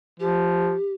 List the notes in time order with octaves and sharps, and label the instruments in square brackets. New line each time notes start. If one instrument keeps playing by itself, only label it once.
[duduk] F3 [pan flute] G4